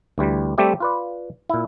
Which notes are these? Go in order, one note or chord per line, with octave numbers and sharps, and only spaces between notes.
D2 E3 G3
G3 A3 C4 G4 D5 E5
F4 B4 D5
A#2 E4